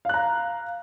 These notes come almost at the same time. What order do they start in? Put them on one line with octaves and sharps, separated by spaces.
F5 F#6 A#5